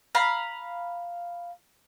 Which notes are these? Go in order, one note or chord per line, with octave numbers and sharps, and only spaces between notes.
F5 A#5 B5